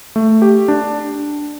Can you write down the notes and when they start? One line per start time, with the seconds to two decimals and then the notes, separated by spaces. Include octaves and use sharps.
0.16 A3
0.42 G4
0.68 D4